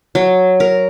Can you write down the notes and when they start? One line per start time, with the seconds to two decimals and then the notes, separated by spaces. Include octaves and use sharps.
0.15 F#3
0.60 A#4